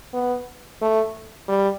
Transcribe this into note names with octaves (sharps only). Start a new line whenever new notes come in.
B3
A3
G3